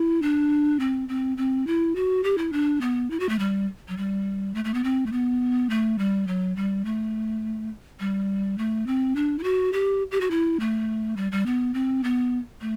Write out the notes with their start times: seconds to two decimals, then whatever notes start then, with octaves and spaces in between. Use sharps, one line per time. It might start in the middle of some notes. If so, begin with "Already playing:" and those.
Already playing: E4
0.22 D4
0.80 C4
1.09 C4
1.38 C4
1.67 E4
1.96 F#4
2.24 G4
2.38 E4
2.53 D4
2.81 B3
3.10 E4
3.20 F#4
3.29 A3
3.39 G3
3.88 F#3
3.97 G3
4.55 A3
4.65 A3
4.74 B3
4.84 C4
5.06 A3
5.12 B3
5.70 A3
5.98 G3
6.27 F#3
6.56 G3
6.85 A3
8.00 G3
8.58 A3
8.87 C4
9.16 D4
9.39 E4
9.44 F#4
9.73 G4
10.11 G4
10.21 F#4
10.31 E4
10.60 A3
11.17 G3
11.32 G3
11.46 B3
11.74 C4
12.04 B3
12.61 A3